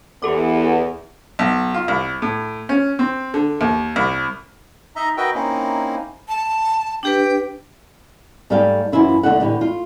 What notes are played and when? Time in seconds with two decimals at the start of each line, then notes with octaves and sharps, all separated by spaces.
0.22 E2 G4 A4 D6
1.39 B1
1.74 F4
1.88 C2
2.22 A2
2.69 C#4
2.99 C4
3.34 D3
3.61 D#2
3.96 C2
4.96 D#4 D#5 E5 A#5
5.17 F#4 A#4 B4 D#5 E5 G5
5.35 A#3 C4 C#4 D#4 E4
6.28 A5
7.03 D4 G4 B4 G5
8.50 G#2 G3 A3 D5 F5 G5
8.92 F#2 E3 C#4 E4 F4
9.23 D#2 D3 D#3 A3 E5 F#5
9.40 A2 D3 E3 G4
9.61 F4